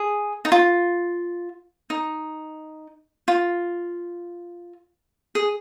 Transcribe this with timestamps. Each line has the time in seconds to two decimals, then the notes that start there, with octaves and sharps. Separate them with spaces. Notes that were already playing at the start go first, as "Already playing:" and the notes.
Already playing: G#4
0.45 D#4
0.52 F4
1.90 D#4
3.28 F4
5.35 G#4